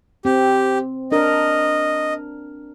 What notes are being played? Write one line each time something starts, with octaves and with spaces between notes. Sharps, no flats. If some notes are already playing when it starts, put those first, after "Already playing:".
C4 G4
D4 A#4 D#5